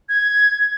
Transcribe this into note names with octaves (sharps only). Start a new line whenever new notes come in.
G#6